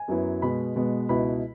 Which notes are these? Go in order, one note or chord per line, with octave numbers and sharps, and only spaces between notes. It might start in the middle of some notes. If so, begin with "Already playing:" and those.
Already playing: G#5
F#2 F#3 B3 E4
B2 G#3 B3 B5
B2 G#3 B3
C#2 B2 B3 E4 B5